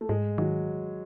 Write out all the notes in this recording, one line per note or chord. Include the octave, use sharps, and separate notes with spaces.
A3
G#2 G#3
D#3 F#3